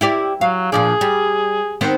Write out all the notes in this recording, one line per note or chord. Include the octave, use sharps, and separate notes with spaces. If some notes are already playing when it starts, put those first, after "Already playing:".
E4 G4 D5
F#3 F5
A#2 F3 D4 G#4
G3
D#3 B3 C4